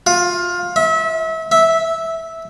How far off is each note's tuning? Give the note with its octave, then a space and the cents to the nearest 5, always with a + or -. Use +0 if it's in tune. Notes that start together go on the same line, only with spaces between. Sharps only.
F4 +20
E5 -30
E5 -10